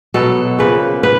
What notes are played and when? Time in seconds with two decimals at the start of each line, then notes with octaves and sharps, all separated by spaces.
0.14 B2 F#3 B3 A4
0.59 C#3 F3 A#3 B4
1.03 B3 B4